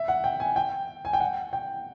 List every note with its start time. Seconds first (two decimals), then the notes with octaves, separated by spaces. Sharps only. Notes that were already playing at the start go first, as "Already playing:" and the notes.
Already playing: E5
0.08 F#5
0.24 G5
0.40 G#5
0.56 G5
1.05 G#5
1.13 G5
1.20 F#5
1.53 G5